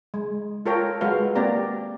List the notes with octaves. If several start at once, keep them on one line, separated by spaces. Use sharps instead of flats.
G#3
F4 A4 A#4 C#5 G5 A#5
G#3 F#4 A4 B4 F5
A#3 C4 G4 D5 A#5